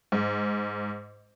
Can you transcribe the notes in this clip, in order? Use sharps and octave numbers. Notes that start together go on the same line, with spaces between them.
G#2